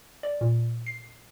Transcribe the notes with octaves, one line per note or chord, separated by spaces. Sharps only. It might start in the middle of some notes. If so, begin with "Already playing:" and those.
D5
A#2
C7